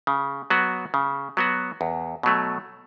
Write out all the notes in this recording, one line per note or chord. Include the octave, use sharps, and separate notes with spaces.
C#3
F#3 B3 F#4
C#3
F#3 B3 F#4
E2
B2 F#3 A3